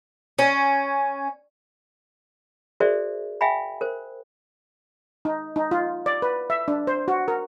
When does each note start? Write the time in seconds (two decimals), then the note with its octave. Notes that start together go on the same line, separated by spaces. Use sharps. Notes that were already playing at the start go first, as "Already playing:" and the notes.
0.39 C#4
2.80 F#4 G#4 A#4 C5 D5 E5
3.41 E5 F5 G5 G#5 B5
3.81 A#4 C5
5.25 D#4
5.56 D#4
5.71 F4
6.06 D5
6.22 B4
6.50 E5
6.68 D4
6.87 C5
7.08 F#4
7.28 A#4